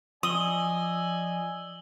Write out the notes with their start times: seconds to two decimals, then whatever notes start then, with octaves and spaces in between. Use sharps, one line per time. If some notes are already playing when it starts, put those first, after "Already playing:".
0.23 F3 D5 D#5 G#5 D#6 E6 F#7 G7